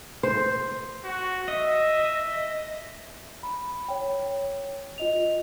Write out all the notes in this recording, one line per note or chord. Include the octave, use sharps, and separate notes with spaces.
C5
F#4
D#5 E5
B5
C#5 G5
F4 D#5 F7